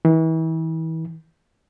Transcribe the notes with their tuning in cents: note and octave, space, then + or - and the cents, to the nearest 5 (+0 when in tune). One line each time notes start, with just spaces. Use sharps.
E3 -35